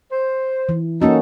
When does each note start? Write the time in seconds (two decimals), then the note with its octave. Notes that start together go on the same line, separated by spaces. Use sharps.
0.12 C5
0.69 E3
1.02 A#3 C#4 D#4 F#4 A4